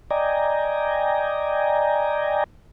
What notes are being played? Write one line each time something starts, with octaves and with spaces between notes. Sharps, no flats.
D5 D#5 G5 G#5 A#5